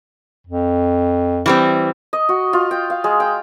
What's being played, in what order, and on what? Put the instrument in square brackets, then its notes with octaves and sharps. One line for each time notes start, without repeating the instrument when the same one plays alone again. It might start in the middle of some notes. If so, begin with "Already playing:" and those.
[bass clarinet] F2
[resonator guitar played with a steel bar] E3 G3 C4
[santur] D#5
F#4
F4
G5
F5
G#3
G5